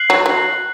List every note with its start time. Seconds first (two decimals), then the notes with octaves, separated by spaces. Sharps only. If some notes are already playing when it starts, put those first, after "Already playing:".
Already playing: F#6 C7 F#7
0.10 F#3
0.26 F#3